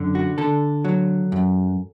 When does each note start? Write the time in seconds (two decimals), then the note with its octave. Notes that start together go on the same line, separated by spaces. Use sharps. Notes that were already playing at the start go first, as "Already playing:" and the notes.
Already playing: F#2 D3
0.15 F#4
0.38 D3 A4
0.85 F#3
1.32 F#2